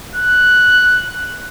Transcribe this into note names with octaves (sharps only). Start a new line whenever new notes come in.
F#6